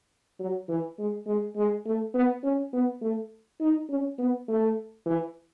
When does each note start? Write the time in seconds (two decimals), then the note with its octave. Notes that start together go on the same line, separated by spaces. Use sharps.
0.40 F#3
0.69 E3
0.99 G#3
1.27 G#3
1.56 G#3
1.86 A3
2.14 B3
2.44 C#4
2.73 B3
3.02 A3
3.61 D#4
3.90 C#4
4.19 B3
4.48 A3
5.06 E3